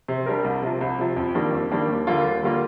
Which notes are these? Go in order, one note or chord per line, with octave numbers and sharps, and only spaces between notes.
C3
G3 D4 G4 A#4
C2
C3 F3
C2
C3 F3
F2
D#3 G3 A#3 D4
F2
D#3 G3 A#3 D4
D#2
D3 G3 A#3 F4
D#2
D3 G3 A#3 F4